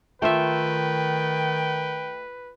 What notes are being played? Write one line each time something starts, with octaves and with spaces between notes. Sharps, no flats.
D#3 A3 F4 B4 E5 G5